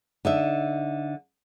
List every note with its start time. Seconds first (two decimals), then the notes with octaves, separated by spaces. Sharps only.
0.25 D3 D#4 E5